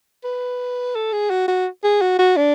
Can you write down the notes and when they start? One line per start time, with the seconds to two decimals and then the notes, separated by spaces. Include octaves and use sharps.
0.24 B4
0.95 A4
1.13 G#4
1.30 F#4
1.48 F#4
1.84 G#4
2.01 F#4
2.19 F#4
2.37 D4